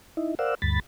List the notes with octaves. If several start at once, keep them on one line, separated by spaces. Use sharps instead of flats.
D#4 E4
A#4 C5 D5 F5 F#5 E6
D2 G2 B5 A6